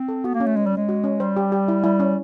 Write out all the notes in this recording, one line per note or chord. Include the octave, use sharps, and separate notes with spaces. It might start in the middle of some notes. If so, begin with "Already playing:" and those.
Already playing: C4
A4
B3 F#4
A#3
C#4
A3
G#3 C#4
G3
G#3 C#4
F#4
C#4
G3 C5
G4
G4
E4
G3 E4
C#4